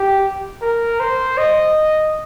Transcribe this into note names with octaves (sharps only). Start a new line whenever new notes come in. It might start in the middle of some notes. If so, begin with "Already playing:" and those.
Already playing: G4
A#4
C5
D#5